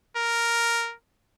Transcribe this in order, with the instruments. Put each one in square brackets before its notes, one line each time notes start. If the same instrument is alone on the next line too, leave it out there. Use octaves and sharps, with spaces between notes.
[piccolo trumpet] A#4